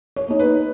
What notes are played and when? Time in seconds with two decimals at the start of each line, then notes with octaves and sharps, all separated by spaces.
0.16 C#5
0.28 A#3 D#4
0.39 B4